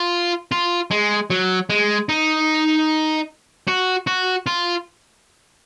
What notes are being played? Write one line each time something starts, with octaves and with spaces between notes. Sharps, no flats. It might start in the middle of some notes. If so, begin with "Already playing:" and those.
Already playing: F4
F4
G#3
F#3
G#3
D#4
F#4
F#4
F4